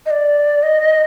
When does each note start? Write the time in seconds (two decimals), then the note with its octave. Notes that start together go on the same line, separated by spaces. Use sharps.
0.06 D#5
0.10 D5
0.63 D#5